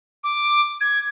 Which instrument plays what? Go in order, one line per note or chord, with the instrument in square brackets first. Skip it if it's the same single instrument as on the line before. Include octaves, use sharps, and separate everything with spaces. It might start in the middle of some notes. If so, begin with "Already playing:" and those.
[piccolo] D6
G#6